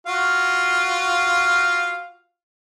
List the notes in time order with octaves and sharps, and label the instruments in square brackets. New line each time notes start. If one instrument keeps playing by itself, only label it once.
[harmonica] F4 F#4 F5